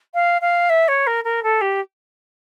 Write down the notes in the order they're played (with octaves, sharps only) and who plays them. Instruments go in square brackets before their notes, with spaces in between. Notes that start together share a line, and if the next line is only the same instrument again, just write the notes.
[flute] F5
F5
E5
C#5
A#4
A#4
A4
G4